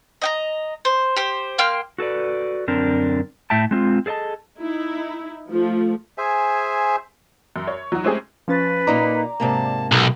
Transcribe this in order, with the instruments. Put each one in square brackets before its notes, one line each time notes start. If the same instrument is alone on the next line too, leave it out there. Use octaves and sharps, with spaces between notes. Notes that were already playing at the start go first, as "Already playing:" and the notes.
[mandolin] D#5 G5 A#5
C5
G4 C5
A#3 G5 C6 F6
[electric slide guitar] F#4 A4 B4 D5
F#2 D3 C4 D4 A#4
A2 E5 G5 A5
G#3 C4 F4
G#4 A4 D5 D#5 A5
[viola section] D#4 E4
F3 A3
[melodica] G#4 C5 E5 G#5
[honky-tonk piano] F#2
C#5
F#3 D#4 F#4
G#3 A3 C4 C#4 G4 G#4
[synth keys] F3 C#4 A6 [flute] B4
[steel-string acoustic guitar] A#2 A#3 D#4 [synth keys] D5 A#5 D6
[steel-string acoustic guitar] G#2 C3 A#3 [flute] A5
[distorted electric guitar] B1